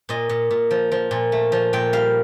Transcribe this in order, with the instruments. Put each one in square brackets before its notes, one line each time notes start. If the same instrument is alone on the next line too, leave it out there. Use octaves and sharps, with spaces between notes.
[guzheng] A#2 D#5
A#2
A#2
F3
F3
A#2
A3
F3
A#2 G5
G3 F5